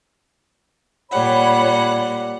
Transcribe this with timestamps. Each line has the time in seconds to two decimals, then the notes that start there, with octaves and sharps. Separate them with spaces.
1.11 A#2 G3 C#5 F#5 B5